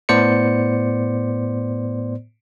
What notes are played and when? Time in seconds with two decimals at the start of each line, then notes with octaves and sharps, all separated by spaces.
0.09 A2 B3 C5 D5 C#7